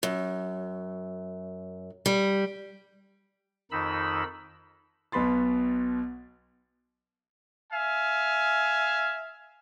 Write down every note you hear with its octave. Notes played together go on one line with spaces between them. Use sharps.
F#2
G3
F2 D#3 D#4 B5 E6
B1 B2 B3 B5 C6 A6
E5 F5 G#5